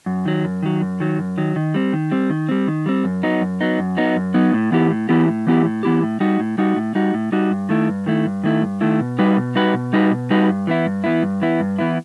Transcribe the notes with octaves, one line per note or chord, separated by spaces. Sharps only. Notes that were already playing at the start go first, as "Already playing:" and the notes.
F#2
D#3 F#3
F#2
D#3 F#3
F#2
D#3 F#3
F#2
D#3 F#3
D#3
G3 C4
D#3
G3 C4
D#3
G3 C4
D#3
G3 C4
F#2
F#3 B3 D#4
F#2
F#3 B3 D#4
F#2
F#3 B3 D#4
F#2
F#3 B3 D#4
A2
E3 B3 E4 G4
A2
E3 B3 E4 G4
A2
E3 B3 E4 G4
A2
E3 B3 E4 G4
A2
G3 D#4 F#4
A2
G3 D#4 F#4
A2
G3 D#4 F#4
A2
G3 D#4 F#4
G2
D#3 A3 E4
G2
D#3 A3 E4
G2
D#3 A3 E4
G2
D#3 A3 E4
B2
G3 D#4 F#4 B4
B2
G3 D#4 F#4 B4
B2
G3 D#4 F#4 B4
B2
G3 D#4 F#4 B4
G2
E3 B3 E4
G2
E3 B3 E4
G2
E3 B3 E4
G2
E3 B3 E4